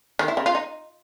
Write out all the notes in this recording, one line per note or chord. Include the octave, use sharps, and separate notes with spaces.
D#3
E4
C#3
F4
D#4